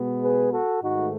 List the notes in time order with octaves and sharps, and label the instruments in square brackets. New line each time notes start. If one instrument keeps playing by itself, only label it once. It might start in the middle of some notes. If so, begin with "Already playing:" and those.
Already playing: [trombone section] B2 G#3 B3
G#4 B4
F#4 A4
G#2 D#3 A3 D#4 F#4